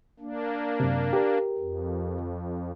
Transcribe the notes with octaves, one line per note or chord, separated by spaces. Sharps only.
A#3 D4
F#2 C3
G4 A#4
F2